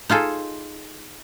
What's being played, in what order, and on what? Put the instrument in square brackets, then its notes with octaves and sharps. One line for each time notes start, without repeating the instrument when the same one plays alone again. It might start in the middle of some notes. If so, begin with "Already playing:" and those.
[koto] D#4 F4 G#4 A4